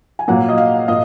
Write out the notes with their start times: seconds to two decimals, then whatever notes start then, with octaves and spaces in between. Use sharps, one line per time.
0.19 G#5
0.28 A#2 F#3 A#3 F#5
0.49 D#5
0.58 F5
0.88 A#2 D#5